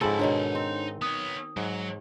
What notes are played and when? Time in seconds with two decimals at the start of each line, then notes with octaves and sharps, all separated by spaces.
0.01 G#2 C#3 F3 C4 D#4 A4 B5
0.19 B2 D#3 D4 C#5 F#5
0.55 C4
1.02 B3 C#5 D#6
1.57 G#2 F#3